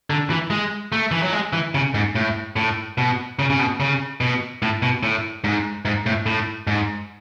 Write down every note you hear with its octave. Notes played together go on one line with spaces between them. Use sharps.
D3
E3
G#3
A3
E3
F#3
G#3
E3
C#3
G#2
A2
A2
B2
C#3
C#3
B2
C#3
B2
A2
B2
A2
G#2
G#2
A2
A2
G#2